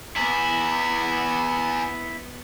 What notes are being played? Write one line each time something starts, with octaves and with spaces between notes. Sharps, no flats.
E2 B3 E4